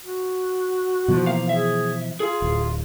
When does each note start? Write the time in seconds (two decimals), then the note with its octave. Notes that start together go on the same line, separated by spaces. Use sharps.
0.04 F#4
1.08 B2 E3 F3
1.27 A#3 F5
1.49 G#4 E5
2.20 F4 G#4
2.42 D1